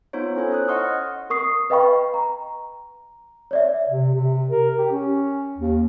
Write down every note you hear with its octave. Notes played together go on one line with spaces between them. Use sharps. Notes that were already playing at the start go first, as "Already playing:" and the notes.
B3 D#4 F4 C5 C#5
C#4 E4 A4 C5 C#5
C#5 D#6 F#6
D#5 F#5 C6 C#6 D#6 F6
A#4 C#6 D#6 C7
B4 D#5 F5 G5 B5 C#6
A#5
C#5 D5 E5
C3
C3
A#4
G4
C#4
D#2